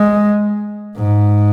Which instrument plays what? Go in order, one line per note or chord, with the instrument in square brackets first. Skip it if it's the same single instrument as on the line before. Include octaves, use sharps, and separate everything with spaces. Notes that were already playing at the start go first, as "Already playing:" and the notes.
Already playing: [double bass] G#3
G#2